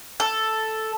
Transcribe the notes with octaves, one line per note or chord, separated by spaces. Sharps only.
A4